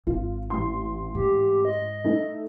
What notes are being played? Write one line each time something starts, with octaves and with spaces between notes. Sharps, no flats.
G#1 F4
A1 C6
G#2 G4
D#5
A3 D#4 A4